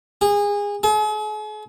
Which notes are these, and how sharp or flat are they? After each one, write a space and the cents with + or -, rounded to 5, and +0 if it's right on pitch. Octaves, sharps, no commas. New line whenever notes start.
G#4 -25
G#4 +45